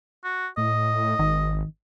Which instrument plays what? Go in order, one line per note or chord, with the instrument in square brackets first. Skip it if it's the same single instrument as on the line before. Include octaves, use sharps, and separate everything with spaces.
[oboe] F#4
[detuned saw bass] A2 [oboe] D#5
[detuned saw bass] G#1 [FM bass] D#3